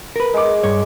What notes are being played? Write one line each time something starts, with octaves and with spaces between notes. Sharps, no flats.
A#4 B4
G#3 D6
G2 C#5